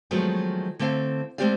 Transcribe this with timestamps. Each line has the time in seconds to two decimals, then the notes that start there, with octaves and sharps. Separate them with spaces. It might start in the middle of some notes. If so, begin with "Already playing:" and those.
0.11 D#3 F3 F#3 G#3 A3 B3
0.79 D3 A3 C4 E4 F5
1.38 G#3 A3 C4 G4 D5 F5